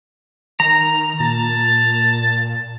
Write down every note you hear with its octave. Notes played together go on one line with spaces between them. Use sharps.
D#3 A#5
A#2 A5